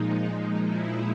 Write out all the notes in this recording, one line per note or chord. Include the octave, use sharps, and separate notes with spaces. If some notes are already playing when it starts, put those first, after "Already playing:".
Already playing: A#2 F3 G#3 D#4
D#4
E4